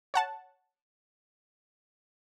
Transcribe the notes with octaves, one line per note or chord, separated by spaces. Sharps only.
C#5 F#5 A5